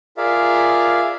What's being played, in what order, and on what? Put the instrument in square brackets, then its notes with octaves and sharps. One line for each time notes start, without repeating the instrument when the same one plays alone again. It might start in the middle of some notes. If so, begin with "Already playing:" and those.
[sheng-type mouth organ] F4 G#4 A#4 D5 E5 F5